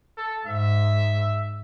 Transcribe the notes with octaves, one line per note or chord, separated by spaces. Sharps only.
A4
G#2 E5